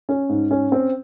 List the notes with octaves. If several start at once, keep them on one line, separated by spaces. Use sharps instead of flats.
C#4
G#2
C#4
C4